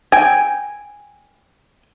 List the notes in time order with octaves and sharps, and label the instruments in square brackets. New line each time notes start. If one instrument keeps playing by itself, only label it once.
[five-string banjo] G5 G#5